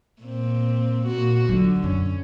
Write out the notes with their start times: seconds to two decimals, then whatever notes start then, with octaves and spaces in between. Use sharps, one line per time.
0.21 A#2 C4
1.07 A#2 F#4
1.49 D3 F#3 F4
1.84 F#2 D3 C#4